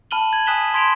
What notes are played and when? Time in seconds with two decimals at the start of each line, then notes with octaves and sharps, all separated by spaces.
0.11 A5 B5 F6 D#7 F#7 G7
0.33 G#6 F#7
0.46 G#5 D#6 F#6 B6 E7 G7
0.74 C6 G#6 B6 D7 E7 F7